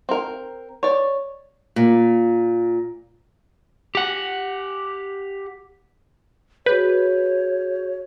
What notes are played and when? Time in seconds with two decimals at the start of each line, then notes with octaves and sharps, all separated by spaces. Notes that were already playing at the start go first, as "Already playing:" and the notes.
0.09 C4 A#4
0.83 C#5 D5
1.76 A#2
3.95 G4 F#5
6.66 F#4 G#4 B4 C#5 G6